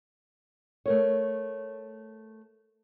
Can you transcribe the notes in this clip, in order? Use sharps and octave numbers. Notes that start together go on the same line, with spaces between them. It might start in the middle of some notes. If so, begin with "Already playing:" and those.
A3 A#4 C#5